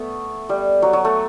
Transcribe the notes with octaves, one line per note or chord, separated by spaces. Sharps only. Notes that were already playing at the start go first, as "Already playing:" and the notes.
Already playing: A3 B3
G3
F#3
F#3
A3